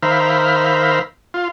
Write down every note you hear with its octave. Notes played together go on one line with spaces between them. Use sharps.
D#3 A#4 C5 E5 F5 B5
F4